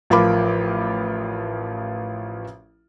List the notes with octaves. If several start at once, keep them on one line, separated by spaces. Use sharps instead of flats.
A1 F3 F4 A#4 B5 D6